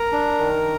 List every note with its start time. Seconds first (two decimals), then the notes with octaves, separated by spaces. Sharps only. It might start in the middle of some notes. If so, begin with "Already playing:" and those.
Already playing: A#4 A#5
0.12 D4
0.38 D#3